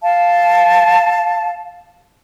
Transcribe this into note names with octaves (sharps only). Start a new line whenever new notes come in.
F5 A5